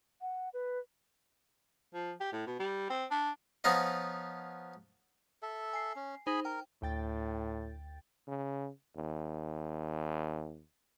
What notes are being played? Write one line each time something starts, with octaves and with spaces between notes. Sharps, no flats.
F#5
B4
F3
G4
A2
B2
G3
C4
D4
F3 B3 C#4 D#4 F4 D#5
A4 E5
G#5 C7
C#4
D#4 G#4 C5 G#5 B5
A#4 G5
D2 A2 G5 A6
C#3
D#2